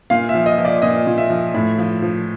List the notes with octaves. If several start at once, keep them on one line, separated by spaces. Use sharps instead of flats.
A#2 F5
E5
F3
D#5
F3
D5
A#2 D#5
A#2
E5
F3
A2
F3
F3